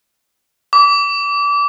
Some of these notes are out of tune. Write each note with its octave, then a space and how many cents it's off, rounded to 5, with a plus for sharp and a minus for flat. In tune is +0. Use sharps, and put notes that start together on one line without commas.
D6 -30